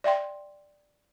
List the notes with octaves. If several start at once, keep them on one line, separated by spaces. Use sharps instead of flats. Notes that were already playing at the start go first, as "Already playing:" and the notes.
D5 E5 G5 C6